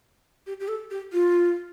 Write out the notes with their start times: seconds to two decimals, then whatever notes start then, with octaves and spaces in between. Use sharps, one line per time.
0.47 G4
0.60 G4
0.68 A4
0.91 G4
1.13 F4